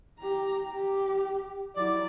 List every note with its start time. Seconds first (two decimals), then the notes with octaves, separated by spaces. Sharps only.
0.19 G4 A#5
0.66 G4
1.76 F#3 E4 D5